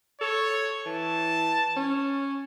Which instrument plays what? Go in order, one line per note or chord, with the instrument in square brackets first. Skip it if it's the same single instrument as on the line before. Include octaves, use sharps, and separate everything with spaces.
[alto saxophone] A4 [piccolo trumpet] C#5
[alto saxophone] E3 [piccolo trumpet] A5
[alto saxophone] C#4